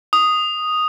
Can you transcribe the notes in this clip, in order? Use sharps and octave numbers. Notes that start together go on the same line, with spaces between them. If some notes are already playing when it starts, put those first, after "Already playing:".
D#6